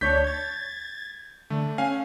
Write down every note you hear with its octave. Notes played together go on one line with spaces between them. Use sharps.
D2 D4 C#5 G6 B6
G#6 A6
D3 A3
C#4 F5 G#5